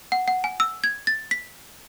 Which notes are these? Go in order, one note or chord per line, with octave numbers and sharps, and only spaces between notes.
F#5
F#5
G#5
E6
G#6
A6
B6